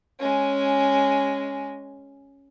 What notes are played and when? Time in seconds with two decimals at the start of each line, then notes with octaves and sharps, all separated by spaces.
0.19 G#3 C#4